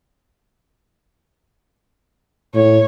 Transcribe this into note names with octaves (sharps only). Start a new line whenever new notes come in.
A2 C#5